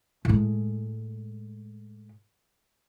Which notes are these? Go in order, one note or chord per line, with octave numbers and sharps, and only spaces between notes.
A2 G#3